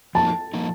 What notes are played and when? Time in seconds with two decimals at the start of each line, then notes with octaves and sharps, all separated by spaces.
0.15 F3 A#3 D#4 A5
0.54 F3 A#3 D#4